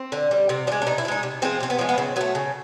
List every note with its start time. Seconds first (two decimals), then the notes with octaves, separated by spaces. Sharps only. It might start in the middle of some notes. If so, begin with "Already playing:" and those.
Already playing: C4
0.12 D3
0.31 G3
0.49 C3 C4
0.67 F3 D4
0.72 G#3
0.82 D4
0.87 C3 D#4
0.98 E4
1.05 F3
1.08 G#3 D#4
1.23 C3
1.42 F3 G#3 C4
1.60 C3 C4
1.70 B3
1.79 F3 G#3 C#4
1.89 B3
1.98 C#3 C4
2.16 F#3 B3
2.21 A3
2.35 C#3